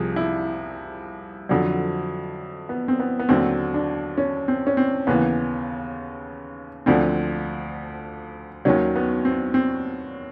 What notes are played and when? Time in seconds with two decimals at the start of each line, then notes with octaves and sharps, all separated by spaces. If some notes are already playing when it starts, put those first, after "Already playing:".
Already playing: C2 C3 F3 G#4
0.16 E4
1.49 F2 D3 F#3
2.69 B3
2.88 C4
3.00 B3
3.19 B3
3.29 D#2 D3 F#3 C4
3.74 D4
4.18 C#4
4.48 C4
4.67 C#4
4.77 C4
5.07 D#2 C#3 E3 B3
6.86 D2 D3 F3 C4
8.65 D#2 D#3 F#3 C#4
8.96 B3
9.25 C4
9.54 C4